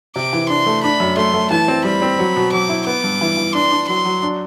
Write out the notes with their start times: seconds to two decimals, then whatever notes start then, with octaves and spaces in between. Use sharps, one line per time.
0.16 C3 D6
0.33 E3
0.49 D4 C6
0.66 A3
0.83 D4 B5
1.00 F#2
1.17 A3 C6
1.34 A3
1.51 E3 A5
1.68 C4
1.85 G3 B5
2.02 C4
2.19 F#3
2.36 B2
2.52 F#3 D6
2.69 E4
2.86 B3 D6
3.04 G2
3.21 E3
3.37 E3
3.55 D4 C6
3.72 D4
3.88 F#3 C6
4.05 F#3
4.22 D4